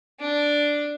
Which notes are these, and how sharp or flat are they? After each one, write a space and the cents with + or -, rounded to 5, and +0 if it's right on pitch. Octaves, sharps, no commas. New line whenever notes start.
D4 +0